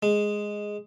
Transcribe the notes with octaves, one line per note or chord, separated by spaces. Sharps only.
G#3